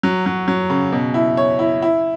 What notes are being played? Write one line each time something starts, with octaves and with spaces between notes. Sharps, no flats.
F#3
F#3
F#3
C#3
B2
E4
C#5
E4
E4